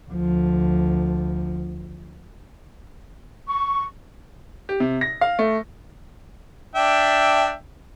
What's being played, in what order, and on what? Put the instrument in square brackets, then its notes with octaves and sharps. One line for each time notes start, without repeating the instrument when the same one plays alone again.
[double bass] D2 F3
[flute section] C#6
[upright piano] G4
C3
A#6
F5
A3
[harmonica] D4 E5 G5